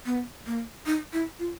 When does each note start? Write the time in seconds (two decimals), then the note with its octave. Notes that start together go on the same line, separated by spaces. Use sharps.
0.06 B3
0.46 A#3
0.86 D#4
1.13 E4
1.39 F4